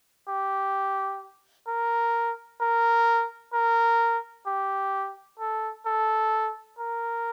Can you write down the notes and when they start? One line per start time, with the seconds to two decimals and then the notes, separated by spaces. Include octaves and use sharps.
0.28 G4
1.67 A#4
2.61 A#4
3.53 A#4
4.46 G4
5.39 A4
5.86 A4
6.79 A#4